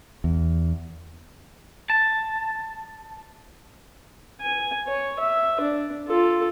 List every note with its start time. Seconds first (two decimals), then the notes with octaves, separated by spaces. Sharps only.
0.24 E2
1.90 A5
4.41 G#5
4.87 C#5
5.19 E5
5.60 D4
6.07 F4 A4